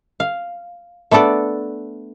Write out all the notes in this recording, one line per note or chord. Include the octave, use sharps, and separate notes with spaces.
F5
A3 B3 D4 A4 D5